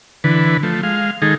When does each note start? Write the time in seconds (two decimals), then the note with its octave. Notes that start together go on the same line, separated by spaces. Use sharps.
0.24 D3 E3 B4
0.63 F3 A3
0.83 G#3 F5
1.22 D#3 G#3 D#4 G#4 A4